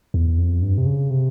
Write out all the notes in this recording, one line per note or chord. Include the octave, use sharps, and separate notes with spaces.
E2
F2
G2
C3
C#3
C3